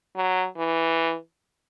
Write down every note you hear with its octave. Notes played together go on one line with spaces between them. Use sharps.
F#3
E3